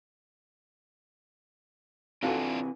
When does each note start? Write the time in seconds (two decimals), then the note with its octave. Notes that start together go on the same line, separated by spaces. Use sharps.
2.23 C3 E3 D4 F4 F#4 A4 F5 G#5